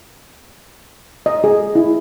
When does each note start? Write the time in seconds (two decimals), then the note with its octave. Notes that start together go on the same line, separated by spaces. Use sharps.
1.26 D#5
1.44 G#4
1.75 E4